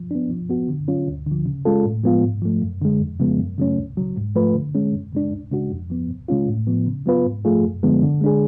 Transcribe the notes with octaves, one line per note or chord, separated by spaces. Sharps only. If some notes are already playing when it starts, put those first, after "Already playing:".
Already playing: F3
B3 D4
F3
B3 F#4
D3
F#3 C#4 F4
D2
D3 F3
C#3
G#3 C#4 F4 A4
A2
F3 G#3 B3 F4
G#2
F3 A3
F#2
D3 G#3
F2
C#3 F3 G#3 B3
F#2
C#3 F#3 A3 C#4
C#2
C#3 F#3
G#2
F3 A3 F4 B4
D3
G#3 C#4
F#2
C#3 G#3 D4
C#2
C#3 G#3 D4 F#4
F2
F3 B3
C#2
C#3 G#3 C#4 F4
A2
F3 B3
C#3
F#3 B3 F4 B4
G#2
F3 A3 F4 G#4
F#2
D3 F3 G#3 B3
D3
G#3 D4 G#4